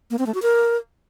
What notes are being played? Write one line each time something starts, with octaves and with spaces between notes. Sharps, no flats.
A#3
C4
A3
F#4
A#4